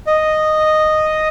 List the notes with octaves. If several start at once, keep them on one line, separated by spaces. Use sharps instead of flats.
D#5